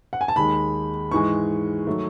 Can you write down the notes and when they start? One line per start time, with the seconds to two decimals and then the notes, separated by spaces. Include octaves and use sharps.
0.13 F#5
0.21 G#5
0.28 A5
0.36 D#2 D#3 G#3 B5
1.11 G#2 E3 G#3 C#6
1.87 D#3 F#3 A3